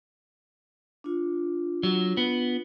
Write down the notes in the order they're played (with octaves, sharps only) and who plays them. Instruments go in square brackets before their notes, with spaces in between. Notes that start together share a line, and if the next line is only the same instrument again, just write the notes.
[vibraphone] D4 F4
[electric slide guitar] F#3
B3